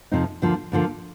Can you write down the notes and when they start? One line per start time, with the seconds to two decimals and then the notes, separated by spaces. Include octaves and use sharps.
0.12 F2 C3 F3 C4 D#4
0.42 D2 D3 F3 A#3
0.72 D2 D3 F3 A#3